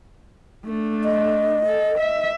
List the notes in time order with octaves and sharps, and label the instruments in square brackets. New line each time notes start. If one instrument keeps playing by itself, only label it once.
[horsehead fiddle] A3 D4
[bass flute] D#5
[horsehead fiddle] A4
E5